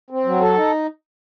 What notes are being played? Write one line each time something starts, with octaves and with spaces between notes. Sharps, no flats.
C4
F#3
A4
D#4